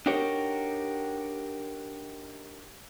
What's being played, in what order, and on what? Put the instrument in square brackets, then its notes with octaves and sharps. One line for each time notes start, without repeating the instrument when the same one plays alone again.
[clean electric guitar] D4 D#4 F#4 G4 A#4 C#5